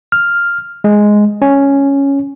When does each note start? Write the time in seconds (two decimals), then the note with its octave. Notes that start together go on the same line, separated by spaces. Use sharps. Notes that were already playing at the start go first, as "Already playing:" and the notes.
0.12 F6
0.84 G#3
1.42 C#4